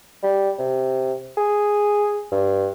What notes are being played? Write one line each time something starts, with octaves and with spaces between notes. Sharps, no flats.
G3
C3
G#4
G2